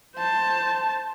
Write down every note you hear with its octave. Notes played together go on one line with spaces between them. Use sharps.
C5 A5